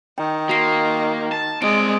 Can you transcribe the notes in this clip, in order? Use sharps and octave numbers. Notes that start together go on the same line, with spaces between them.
D#3 G5
A#3 F#4 C7
A5
G#3 C4 D5 D7